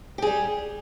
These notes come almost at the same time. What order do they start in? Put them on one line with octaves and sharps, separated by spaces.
G4 G#4 G3